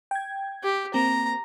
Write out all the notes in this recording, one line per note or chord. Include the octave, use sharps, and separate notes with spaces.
G5 G#6
G4
A#3 C4 A#5